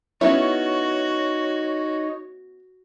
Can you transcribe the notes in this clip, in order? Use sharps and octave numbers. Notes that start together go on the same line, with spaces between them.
B3 C#4 D#4 E4 F#4 C#5